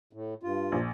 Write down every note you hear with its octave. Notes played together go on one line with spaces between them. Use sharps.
A2
G2 F4
A#1